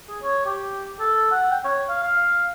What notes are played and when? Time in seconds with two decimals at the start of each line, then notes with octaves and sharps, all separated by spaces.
0.09 G#4
0.22 C#5
0.46 G4
1.00 A4
1.32 F#5
1.51 G5
1.65 C#5
1.89 F5
2.03 F5